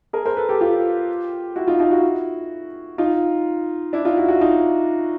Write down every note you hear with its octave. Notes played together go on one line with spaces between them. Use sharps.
G#4 A#4
A#4 C5
A4 B4
G4 A4
F4 G4
E4 F#4
D#4 F4
D#4 F4
E4 F#4
D#4 F4
D4 E4
D#4 F4
E4 F#4
E4 F#4
D#4 F4